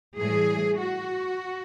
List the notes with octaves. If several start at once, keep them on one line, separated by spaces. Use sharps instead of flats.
A2 E3 G3 G#4
F#4